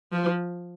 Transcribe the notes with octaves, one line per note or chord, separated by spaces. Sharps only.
F3